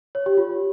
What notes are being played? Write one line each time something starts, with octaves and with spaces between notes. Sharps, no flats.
C#5
G4
F4